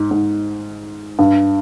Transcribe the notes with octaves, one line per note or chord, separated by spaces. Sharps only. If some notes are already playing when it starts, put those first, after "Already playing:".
Already playing: G#2
G#2
G2